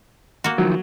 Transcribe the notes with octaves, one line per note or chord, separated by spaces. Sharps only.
A#3 F#4
D#3 F3 F#3